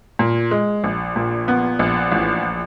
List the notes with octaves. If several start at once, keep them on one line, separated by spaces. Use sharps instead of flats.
A#2
G#3
A#1
A#2
B3
A#1
A1